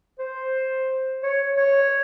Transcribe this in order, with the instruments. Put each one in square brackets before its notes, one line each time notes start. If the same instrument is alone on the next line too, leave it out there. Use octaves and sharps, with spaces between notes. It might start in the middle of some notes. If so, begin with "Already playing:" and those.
[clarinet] C5
C#5
C#5